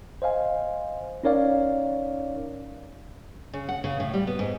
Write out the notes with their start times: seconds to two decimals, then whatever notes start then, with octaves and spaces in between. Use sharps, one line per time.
0.22 C5 D#5 F5 G#5
1.23 C#4 D#4 A#4 C#5 D5 F5
3.53 C#3
3.69 F#5
3.84 C#3
4.00 A2
4.14 G3
4.27 B3
4.39 G#2